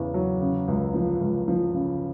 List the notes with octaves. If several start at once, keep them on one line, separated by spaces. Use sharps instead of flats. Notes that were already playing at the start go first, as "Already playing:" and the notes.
Already playing: E2 C#3
F#3
C#3
C#2
F3
C#2
F3
C#3